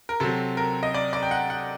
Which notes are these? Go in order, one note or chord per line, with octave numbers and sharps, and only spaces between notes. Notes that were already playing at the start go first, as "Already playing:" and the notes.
A#4
C3 F#3 C4 A4
A#4
D#5
D5
D5
G5
F#5
F#5